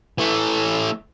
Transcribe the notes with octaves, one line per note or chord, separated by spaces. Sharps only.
E3 A3